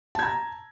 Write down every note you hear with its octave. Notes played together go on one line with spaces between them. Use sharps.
A5 A#5 G#6